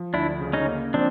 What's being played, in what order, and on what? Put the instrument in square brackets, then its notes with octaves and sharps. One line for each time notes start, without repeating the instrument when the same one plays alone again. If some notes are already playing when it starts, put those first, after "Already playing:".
Already playing: [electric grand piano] F3
[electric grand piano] D2 [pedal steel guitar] D4 E4
[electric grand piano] C#3
[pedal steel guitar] C#4 D#4
[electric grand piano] A#3
[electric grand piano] F3 [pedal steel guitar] C4 D4